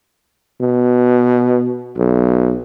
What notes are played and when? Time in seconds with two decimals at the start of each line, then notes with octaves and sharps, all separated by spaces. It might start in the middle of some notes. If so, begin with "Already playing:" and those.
0.61 B2
1.97 B1